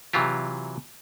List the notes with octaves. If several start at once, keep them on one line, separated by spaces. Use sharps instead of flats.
C3 E3 F#3 F4 G4